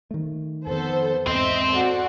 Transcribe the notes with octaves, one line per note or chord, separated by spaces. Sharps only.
D#3 A3
F2 D#3 B3 A4 C5
E2 G#2 C4 C5 D#5 E5
F#4 A4 D5